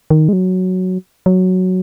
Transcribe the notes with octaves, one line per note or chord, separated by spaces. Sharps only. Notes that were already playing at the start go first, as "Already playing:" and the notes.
D#3
G#3
F#3
F#3